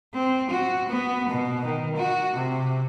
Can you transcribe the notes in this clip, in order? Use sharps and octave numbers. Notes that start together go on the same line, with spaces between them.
C4
F#4
B3
B2
D#3
F#4
C3